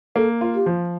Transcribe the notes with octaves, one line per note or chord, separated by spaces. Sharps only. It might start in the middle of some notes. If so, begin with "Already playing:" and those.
A#3 A4
F4
G4
F3